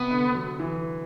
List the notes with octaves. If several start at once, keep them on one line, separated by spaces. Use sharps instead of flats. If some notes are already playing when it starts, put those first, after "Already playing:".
Already playing: C3 B3
D3
F#3
E3